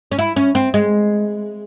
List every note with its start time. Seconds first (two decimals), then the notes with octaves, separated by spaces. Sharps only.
0.12 C#4
0.19 E4
0.36 C#4
0.55 C4
0.74 G#3